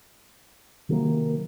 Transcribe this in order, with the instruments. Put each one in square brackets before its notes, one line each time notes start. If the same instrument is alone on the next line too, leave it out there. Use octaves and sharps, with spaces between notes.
[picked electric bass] C3 D#3 F#3 A#3